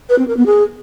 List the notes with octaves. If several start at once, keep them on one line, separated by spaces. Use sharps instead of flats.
B4
C4
A#4
B3
G#4